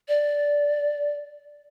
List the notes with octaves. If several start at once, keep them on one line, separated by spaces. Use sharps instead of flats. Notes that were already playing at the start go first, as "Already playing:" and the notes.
D5